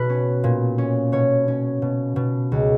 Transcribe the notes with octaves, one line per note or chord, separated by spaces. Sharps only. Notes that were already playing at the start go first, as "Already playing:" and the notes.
Already playing: B2 B4
C#4
A#2
C#4
B2 C#5
C#4
B2
B2
C#2